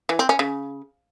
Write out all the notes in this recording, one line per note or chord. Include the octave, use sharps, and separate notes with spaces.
E3
C4
C#4
C#3